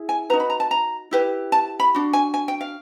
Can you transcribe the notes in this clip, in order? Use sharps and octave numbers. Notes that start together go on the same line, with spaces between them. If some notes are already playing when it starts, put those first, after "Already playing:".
Already playing: E4 G#4
G#5
D#4 F#4 B4 A#5
B5
A#5
A5
A#5
E4 G4 B4
A5
B5
D4 F#4
G#5
G#5
G5
F5